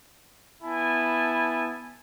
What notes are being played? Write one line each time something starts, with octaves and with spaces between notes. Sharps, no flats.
B3 E4 G#5 A5